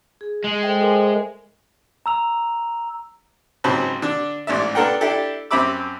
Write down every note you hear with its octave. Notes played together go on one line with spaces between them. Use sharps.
G#4
G#3
A4 C5 E5 G5
G#4 A#4 G#5
A#5 E6 F7
C#2 G#2 F#3 C4 A5 B5
D3 D4
A1 G#2 D5 E5
B3 D4 A4 A#4 F#5 G5
D4 E4 G4 A4
F#2 C4 E5 B5 D6 E6